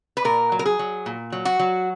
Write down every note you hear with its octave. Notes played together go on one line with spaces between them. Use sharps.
B4
A#2 A#4
F#3
A#4
G#4
F#3
A#2
F#3
F#4
F#3